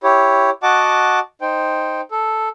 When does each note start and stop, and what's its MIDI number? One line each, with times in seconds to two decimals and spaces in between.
0.03 0.50 64
0.03 0.50 67
0.03 0.50 73
0.63 1.19 66
0.63 1.19 75
0.63 1.19 78
0.63 1.19 81
0.63 1.19 86
1.41 2.01 63
1.41 2.01 72
1.41 2.01 79
2.11 2.49 69